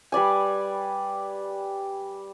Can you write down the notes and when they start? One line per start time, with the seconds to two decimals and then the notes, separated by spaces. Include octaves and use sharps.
0.12 G3 B4 D5 G#5